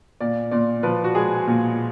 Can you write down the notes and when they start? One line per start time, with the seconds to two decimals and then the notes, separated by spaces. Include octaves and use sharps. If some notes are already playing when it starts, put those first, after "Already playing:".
0.20 A#2 D5
0.51 A#2 D5
0.83 F3 B4
1.04 F#4
1.15 G#3 G#4
1.47 A#2